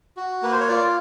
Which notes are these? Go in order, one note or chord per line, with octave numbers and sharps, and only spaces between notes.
F#4
A#3 B4
C5
C#5
F4 D5